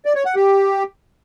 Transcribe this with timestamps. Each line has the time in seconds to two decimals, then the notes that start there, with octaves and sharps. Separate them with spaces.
0.05 D5
0.15 C#5
0.25 F#5
0.35 G4